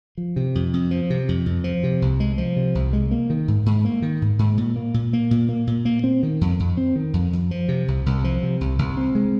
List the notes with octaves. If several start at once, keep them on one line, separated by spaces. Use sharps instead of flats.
F3
C3
F2
F2
F3
C3
F2
F2
F3
C3
C2
G#3
F3
C3
C2
G#3
A#3
D#3
G#2
G#2
A#3
D#3
G#2
G#2
A#2
A#3
A#2
A#3
A#2
A#3
A#2
A#3
C4
D#3
F2
F2
C4
D#3
F2
F2
F3
C3
C2
C2
F3
C3
C2
C2
C4
G#3